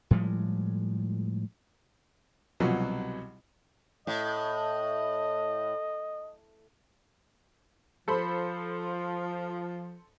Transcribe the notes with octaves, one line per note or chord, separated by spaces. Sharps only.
A2 F3 G3 G#3
C2 B2 F3 F#3
A2 D#5
F3 A4 C5 B5